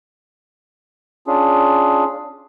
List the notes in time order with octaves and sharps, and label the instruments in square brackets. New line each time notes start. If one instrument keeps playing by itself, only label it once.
[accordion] C#4 D4 F4 G#4